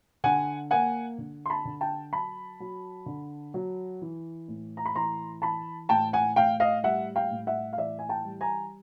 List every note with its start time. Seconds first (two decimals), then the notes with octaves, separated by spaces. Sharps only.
0.24 D3 F#5 G#5
0.71 A#3 F#5 G#5
1.18 D3
1.46 C6
1.50 A5 B5
1.65 D3
1.81 G5 A5
2.12 F#3 A5 B5
2.60 F#3
3.06 D3
3.54 F#3
4.02 E3
4.48 A2
4.77 A#5
4.86 B5
4.95 E3 A#5 C6
5.42 E3 A5 B5
5.89 A2 G5 A5
6.13 F#5 G#5
6.36 A2 F5 G5
6.60 D#5 F5
6.83 G3 E5 F#5
7.16 F5 G5
7.31 A2
7.47 E5 F#5
7.73 F5
7.78 E3 D5 E5
7.99 G#5
8.09 G5 A5
8.24 G3
8.41 G#5 A#5